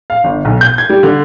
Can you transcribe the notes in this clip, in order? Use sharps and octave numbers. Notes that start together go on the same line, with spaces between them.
F5
G1
B1
G6
G#6
G3
D3